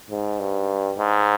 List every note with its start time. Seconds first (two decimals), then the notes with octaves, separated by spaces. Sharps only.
0.11 G#2
0.40 G2
0.98 G#2